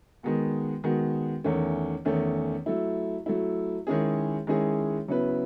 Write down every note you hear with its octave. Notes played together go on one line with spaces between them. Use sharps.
D#3 G#3 B3 F#4
D#3 G#3 B3 F#4
E2 D#3 A3 C#4
E2 D#3 A3 C#4
F#3 A3 E4
F#3 A3 E4
D#3 G#3 C#4 E4 G#4
D#3 G#3 C#4 E4 G#4
C#3 F#3 B3 E4 B4